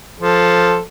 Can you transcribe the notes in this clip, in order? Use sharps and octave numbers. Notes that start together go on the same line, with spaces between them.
F3 A4